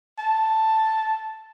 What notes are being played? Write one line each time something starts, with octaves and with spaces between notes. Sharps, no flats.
A5